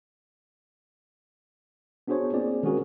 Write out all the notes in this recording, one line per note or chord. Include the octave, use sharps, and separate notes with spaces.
B3 D4 F#4 G#4 C5 C#5
A#3 C4 F4 G#4 D5
D#3 G#3 C#4 F#4 G#4 A#4